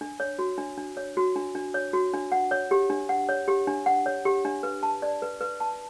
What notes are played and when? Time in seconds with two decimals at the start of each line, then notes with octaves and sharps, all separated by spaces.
0.01 D4
0.20 C#5
0.39 F#4
0.58 D4
0.77 D4
0.97 C#5
1.17 F#4
1.36 D4
1.55 D4
1.74 C#5
1.93 F#4
2.14 D4
2.32 F#5
2.51 C#5
2.71 G4
2.90 D4
3.09 F#5
3.29 C#5
3.48 G4
3.67 D4
3.86 F#5
4.06 C#5
4.25 G4
4.45 D4
4.63 B4
4.83 A5
5.02 D5
5.22 B4
5.41 B4
5.60 A5